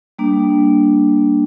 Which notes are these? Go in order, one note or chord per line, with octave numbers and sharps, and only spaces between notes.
G3 A#3 D4